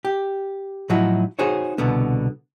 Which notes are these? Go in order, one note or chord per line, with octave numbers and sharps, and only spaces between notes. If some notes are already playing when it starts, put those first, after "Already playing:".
G4
A2 F3 F#3 D#4 E4 F#4
D#4 F#4 G#4 C5 C#5
C2 B2 D3 B3